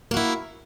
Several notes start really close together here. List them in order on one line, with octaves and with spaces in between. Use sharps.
A#3 F#4 E4